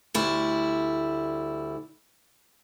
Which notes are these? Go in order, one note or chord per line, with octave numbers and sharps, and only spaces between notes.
D2 G3 E4